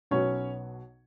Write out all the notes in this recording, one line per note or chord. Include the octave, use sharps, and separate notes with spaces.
B1 B2 F#3 B3 C#4 C#5